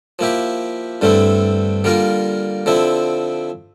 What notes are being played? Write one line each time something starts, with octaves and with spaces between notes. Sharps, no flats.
F3 A#3 E4 G4
G2 D3 A3 C4 E4
D3 G3 A#3 F4 A#4
D3 F3 C4 E4